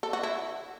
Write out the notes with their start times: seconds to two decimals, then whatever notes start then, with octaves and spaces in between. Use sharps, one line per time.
0.03 A4
0.13 F#4
0.23 E4